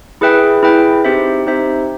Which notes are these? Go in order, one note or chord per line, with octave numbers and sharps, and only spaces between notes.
E4 G#4 B4 E5 G5
E4 G#4 B4 E5 G5
C4 D#4 G4 C5 E5
C4 D#4 G4 C5 E5